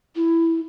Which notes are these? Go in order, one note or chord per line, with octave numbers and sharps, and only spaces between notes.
E4